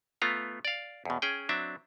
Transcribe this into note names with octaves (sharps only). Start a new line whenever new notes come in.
A3 B3 F4 A#5
D5 F5
E2 B2
C#4 G#4 G5
F#3 C4 D4 E5